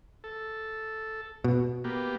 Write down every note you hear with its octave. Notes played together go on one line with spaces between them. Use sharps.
A4
B2
A#3 B3 G4